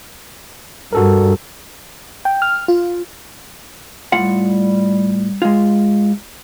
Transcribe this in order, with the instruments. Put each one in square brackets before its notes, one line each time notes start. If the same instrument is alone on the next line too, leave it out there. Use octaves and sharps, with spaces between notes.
[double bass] G2 [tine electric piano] F#4 A4 A#4
[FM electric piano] G5
F6
F4
[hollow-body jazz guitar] A2 F4 F#5 [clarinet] G3
[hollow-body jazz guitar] G#3 F4